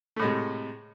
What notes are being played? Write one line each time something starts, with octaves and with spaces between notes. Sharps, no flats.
A2 C3 G#3 A3